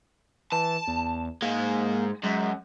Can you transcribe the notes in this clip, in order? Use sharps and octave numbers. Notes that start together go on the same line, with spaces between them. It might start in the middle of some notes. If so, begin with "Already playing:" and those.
E3 A5
E2
G#2 G#3 A#3
F#2 G#3